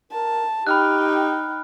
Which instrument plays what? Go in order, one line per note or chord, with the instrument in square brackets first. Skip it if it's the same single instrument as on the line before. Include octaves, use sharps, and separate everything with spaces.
[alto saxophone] A#4 [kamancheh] A5
[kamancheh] D#4 G5 [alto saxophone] G4 [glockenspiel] B5 F6 F#6